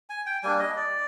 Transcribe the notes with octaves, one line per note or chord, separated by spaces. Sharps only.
G#5
G5
G3 A#3 D4 G#5
D#5
D5